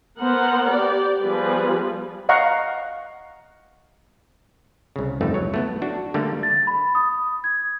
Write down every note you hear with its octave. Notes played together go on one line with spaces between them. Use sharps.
B3 A#4 C5 F#5
G4 D5
F3 G3 B3 G#4 B4
D#5 F5 F#5 A#5 C#6
C2 C#3
G1 C2 F2 A3 D#4
F#3 C#5
A3 B3 E4
D4 F#4
D3 G3 A3 A#3
A6
B5
D#6
G#6